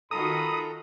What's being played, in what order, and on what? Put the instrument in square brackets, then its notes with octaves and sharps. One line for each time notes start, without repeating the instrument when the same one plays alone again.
[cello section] D#3 F4 F#4 [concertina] A4 A#5 [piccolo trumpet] B5 [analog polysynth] D#6